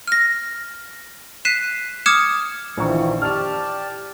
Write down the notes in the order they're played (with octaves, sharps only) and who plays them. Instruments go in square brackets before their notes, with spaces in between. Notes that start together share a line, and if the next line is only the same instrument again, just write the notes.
[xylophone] F6 A#6
F#6 B6 C7 D#7 E7
D6 D#6 F6 G#6 C#7 E7
[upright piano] A#1 C5 C#6 [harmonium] A#2 D#3 E3
[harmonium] G4 D5 A5 [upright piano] F6 F7